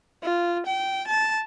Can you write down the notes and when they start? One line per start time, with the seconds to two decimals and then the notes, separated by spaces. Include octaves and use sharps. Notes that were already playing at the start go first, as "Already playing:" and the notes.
0.23 F4
0.66 G5
1.08 A5